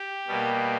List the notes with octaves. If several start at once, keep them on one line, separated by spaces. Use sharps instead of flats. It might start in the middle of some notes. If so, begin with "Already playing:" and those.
Already playing: G4
B2 G3 A#3